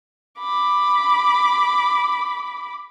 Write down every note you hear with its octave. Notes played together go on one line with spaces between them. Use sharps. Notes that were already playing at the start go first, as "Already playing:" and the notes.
B5 D6